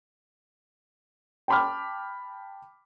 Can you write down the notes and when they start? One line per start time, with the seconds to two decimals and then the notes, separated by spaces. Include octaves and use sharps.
1.48 G5 A5 B5 D6 F6